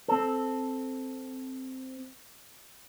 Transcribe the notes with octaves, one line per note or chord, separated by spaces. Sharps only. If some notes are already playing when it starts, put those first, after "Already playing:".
C4 A4